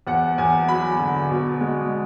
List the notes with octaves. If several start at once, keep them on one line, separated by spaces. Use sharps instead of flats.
E2 F#5
E2 G#5
F#3 B5
D3
B2
G#3